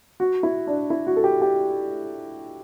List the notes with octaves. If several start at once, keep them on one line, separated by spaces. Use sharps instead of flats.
F#4
E4
D4
E4
F#4
A4
G4
G4